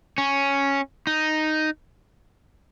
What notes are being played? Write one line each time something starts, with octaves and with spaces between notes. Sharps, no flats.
C#4
D#4